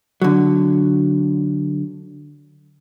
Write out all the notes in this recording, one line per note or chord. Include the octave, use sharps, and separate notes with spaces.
D3 F#3